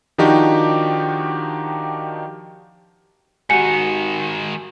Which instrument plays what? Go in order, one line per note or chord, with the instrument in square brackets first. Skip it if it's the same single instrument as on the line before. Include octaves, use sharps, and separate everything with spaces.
[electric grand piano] D#3 F3 D4 D#4 F#4 G4
[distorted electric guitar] G#2 D#3 [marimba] F#4 G4 F#5 [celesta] G#5 [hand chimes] C#7